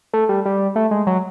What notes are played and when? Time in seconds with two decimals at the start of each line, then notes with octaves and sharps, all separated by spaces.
0.13 A3
0.29 G3
0.46 G3
0.76 A3
0.91 G#3
1.07 F#3